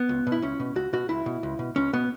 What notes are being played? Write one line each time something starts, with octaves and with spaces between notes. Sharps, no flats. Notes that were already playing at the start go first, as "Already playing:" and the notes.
Already playing: B3
C#2
B2
E4
C#2 C#4
B2
C#2 F#4
B2 F#4
C#2 E4
B2
C#2
B2
C#2 C#4
B2 B3